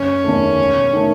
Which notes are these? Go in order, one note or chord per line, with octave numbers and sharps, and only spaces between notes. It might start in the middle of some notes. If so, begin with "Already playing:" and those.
Already playing: F#1 C#4
E2 D#3 A3
E1
D#3 A3